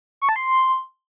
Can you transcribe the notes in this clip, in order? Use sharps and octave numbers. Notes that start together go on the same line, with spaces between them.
C#6
A5
C6